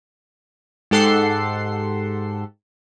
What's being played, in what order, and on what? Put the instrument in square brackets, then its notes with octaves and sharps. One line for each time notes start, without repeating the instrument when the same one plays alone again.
[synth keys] G#2 G4 A4 F#5 C6 C7